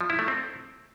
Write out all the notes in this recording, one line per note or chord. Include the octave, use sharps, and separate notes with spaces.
F3
E4
A3
C4